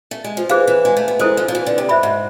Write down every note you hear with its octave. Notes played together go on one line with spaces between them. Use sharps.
A3
G#3
F3
E3 G#4 C5 F5
E3
G#3
A3
B3
G#3 E4 A4 C5 G#5
F3
F3
E3
D3
C3
G#2 C5 E5 B5
G#2